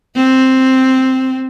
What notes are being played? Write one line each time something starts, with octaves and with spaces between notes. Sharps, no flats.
C4